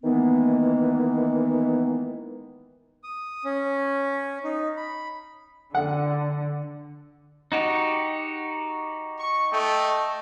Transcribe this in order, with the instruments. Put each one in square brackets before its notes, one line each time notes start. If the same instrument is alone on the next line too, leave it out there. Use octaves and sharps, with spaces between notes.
[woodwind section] D#3 E3 G#3 A#3 B3
[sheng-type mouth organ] D#6
C#4
D#4
B5
[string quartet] D3 [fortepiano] F#5
[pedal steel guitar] D#4 F#4 G4
[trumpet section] C#6
A3 D#5 G5